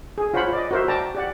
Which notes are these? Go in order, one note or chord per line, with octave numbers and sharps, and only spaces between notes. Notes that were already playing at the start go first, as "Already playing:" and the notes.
G#4
F4 C5 C#5 F#5 B5
D5 D#5
F#4 A#4 C5 E5
D5 G5 A5 A#5
G4 D5 F#5